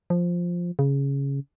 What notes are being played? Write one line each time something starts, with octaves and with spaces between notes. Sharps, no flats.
F3
C#3